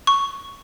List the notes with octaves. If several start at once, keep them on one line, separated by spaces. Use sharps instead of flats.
C#6